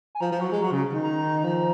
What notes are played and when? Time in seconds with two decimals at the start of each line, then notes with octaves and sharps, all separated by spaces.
0.15 G#5
0.21 F3 A#5
0.32 F3
0.41 F#3
0.52 G#3
0.62 F#3
0.72 C#3
0.93 D#3
1.03 A#5
1.45 F3